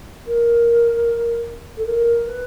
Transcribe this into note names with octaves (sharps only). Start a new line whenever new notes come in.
A#4
A4
A#4
B4